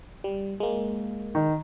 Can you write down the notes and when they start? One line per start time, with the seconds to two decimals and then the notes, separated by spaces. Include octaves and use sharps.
0.24 G3
0.60 G#3 A#3
1.35 D#3